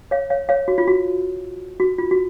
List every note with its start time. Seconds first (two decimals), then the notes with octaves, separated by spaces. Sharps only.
0.11 C#5 F5
0.30 C#5 F5
0.49 C#5 F5
0.68 F#4
0.78 F4
0.87 F#4
1.80 F#4
1.98 F4
2.11 F#4